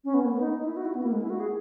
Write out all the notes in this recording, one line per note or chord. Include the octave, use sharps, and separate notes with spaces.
C#4
B3
A#3
B3
D#4
D#4
E4
F#4
E4
B3
A#3
G#3
E4
F#4
G#4